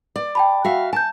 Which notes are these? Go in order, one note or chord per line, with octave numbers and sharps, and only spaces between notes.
D5
G5 A5 B5
F#4 E5 F5
G#5 A5 G6